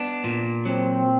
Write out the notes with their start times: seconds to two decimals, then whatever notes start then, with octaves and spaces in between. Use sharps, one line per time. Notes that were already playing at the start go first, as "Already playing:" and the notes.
Already playing: B3 D4
0.24 A#2
0.65 F#3 C4